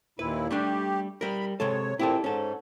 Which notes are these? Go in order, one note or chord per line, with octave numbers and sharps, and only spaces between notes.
D#2 A#2 E4 B4
G3 A3 D4 G4
G3 A#4 B5
C3 G#3 A4 C#5
A#2 C4 E4 G4 A4
G#2 C#4 A4